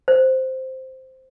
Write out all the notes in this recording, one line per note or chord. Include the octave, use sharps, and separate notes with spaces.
C5